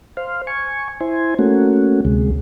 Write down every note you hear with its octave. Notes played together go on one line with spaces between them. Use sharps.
C5 F5
G#5 C#6
E4 C5 G#5
A3 A#3 C#4 F#4
D2 C3 G#3